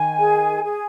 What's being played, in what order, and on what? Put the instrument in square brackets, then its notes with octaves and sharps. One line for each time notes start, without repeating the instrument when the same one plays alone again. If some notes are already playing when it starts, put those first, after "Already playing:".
Already playing: [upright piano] D#3 [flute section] G#5
[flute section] G#4
G#4